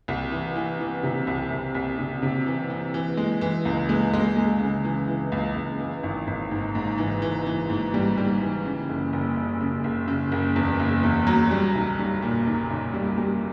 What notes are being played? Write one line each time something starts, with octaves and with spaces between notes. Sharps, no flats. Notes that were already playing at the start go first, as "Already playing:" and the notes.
C2
E3
E3
E3
C3
C2
C2
C2
C3
C3
E3
E3
E3
G#3
E3
C#2
G#3
G#3
G#3
C#3
E3
E3
C#2
C#2
E3
G#1
G#1
G#2
G#2
E3
E3
E3
G#2
G3
G3
E3
C#3
F#1
F#1
C#3
C#3
F#1
C#3
F#1
E2
F#1
E2
F#3
G3
B1
G3
A#2
B1
B1
G3
G3